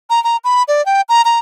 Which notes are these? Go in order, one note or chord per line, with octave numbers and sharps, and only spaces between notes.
A#5
A#5
B5
D5
G5
A#5
A#5